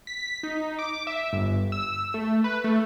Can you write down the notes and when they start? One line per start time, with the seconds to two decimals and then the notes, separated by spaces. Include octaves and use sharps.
0.07 B6
0.43 D#4
0.79 D6
1.07 E5
1.33 G1
1.72 E6
2.14 A3
2.44 B4
2.64 A3